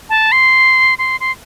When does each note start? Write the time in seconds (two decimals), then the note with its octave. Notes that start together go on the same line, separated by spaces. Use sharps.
0.10 A5
0.32 C6
0.98 C6
1.20 C6